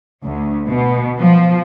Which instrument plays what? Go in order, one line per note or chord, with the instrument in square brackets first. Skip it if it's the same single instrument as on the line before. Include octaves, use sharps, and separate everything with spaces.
[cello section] D2
B2
F3